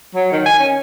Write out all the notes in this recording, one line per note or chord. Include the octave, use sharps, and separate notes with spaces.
F#3
D#3
G#5
C#4